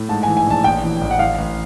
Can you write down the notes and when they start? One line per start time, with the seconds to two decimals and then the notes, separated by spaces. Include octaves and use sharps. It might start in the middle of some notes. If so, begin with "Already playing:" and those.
Already playing: A2
0.09 G#2 A5
0.23 G#5
0.28 E3
0.37 G#5
0.46 A#1 A5
0.64 A1 G5
0.83 E3
1.01 A1
1.11 F#5
1.19 A1 F5
1.38 A1